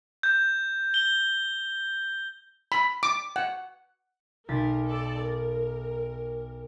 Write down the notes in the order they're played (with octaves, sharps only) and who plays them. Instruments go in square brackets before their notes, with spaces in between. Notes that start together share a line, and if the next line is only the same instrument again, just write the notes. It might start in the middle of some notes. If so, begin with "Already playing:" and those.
[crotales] G6
G7
[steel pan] B5
D6
F#5
[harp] B1 A6 B6 [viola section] A#4
[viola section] A4 D5
A#4